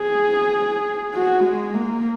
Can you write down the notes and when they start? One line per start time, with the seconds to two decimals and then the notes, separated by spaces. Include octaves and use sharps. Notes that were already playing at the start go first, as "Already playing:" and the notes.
Already playing: G#4
1.14 F#4
1.44 G#3
1.74 A#3